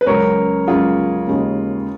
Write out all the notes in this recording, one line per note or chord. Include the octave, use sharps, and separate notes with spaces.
B4
C#2 C#3 F#3 A#4 C#5
C#2 C#3 F#3 F4 G#4
D#2 C#3 G#3